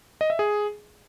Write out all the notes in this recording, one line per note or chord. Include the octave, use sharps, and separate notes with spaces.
D#5
E5
G#4